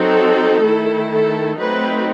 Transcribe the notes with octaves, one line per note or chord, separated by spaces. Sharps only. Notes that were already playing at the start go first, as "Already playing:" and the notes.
Already playing: F#3 C4 D#4 A4
D#3 A3 E4
A4
F#3 A3 C4 D#4 B4